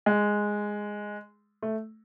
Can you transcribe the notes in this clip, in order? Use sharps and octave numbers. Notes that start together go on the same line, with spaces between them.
G#3
A3